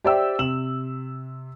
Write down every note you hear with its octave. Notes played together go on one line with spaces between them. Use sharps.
G4 C5 D5 E5 G5 E6
C3 E6 E7 F#7